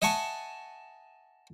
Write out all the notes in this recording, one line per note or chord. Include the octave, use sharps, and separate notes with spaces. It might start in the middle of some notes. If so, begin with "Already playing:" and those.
D#5 E5 F#5 G#5 A5 C#6